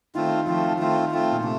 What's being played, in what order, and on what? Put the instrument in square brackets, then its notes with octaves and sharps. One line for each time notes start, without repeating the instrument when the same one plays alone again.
[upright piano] D#3 [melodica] A3 C4 F4
[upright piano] F3 [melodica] A3 C4 F4
[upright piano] D#3 [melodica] A3 C4 F4
[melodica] A3 C4 F4
[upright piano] A#2
[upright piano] C3 [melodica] A3